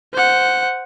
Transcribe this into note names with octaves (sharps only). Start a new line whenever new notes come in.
C5 F#5